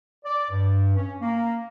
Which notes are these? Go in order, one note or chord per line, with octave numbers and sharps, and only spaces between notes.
D5
G2
C#4
A#3